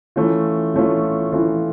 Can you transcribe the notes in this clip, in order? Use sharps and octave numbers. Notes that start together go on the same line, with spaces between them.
E3 A3 C#4 F4
E3 A3 C#4 F4
E3 A3 C#4 F4